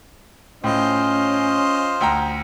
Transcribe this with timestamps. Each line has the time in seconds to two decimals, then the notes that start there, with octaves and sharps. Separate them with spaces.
0.64 A2 C#4 F4 C5 D#5
2.01 D2 G5 A#5